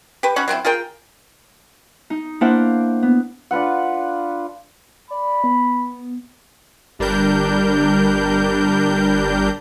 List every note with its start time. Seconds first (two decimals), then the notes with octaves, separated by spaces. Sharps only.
0.23 G4 B4
0.36 C#4 D#4 F#4 B5
0.48 F#3 C4 D4 E4
0.65 F4 G#4 A#4 G5
2.10 D#4
2.41 A#3 D4 E4 C5 F5 F#5
3.03 B3
3.51 D4 F4 B4 F#5
5.11 D5 B5
5.44 B3
6.99 G1 G3 D4 A#4 G6